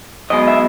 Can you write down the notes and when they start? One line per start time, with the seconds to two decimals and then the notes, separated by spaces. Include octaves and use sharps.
0.30 B1 B2 G#3 D#5
0.48 E5